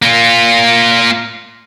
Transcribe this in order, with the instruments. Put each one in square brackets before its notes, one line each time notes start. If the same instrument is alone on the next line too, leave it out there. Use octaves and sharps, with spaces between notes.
[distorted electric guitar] A#3 F4